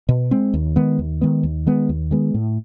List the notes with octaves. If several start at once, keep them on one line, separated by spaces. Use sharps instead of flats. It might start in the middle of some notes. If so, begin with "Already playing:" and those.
B2
G#3 C4
D#2
D#3 G#3 B3
D#2
D#3 G#3 B3
D#2
D#3 G#3 B3
D#2
D#3 G#3 B3
A2